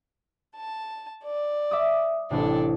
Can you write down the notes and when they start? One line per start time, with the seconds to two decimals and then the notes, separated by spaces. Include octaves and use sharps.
0.55 A5
1.24 D5
1.71 E5 D6 D#6
2.31 A1 C3 D4 A4